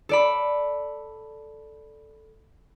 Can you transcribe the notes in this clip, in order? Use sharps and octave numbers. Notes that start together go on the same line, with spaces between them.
A4 D5 B5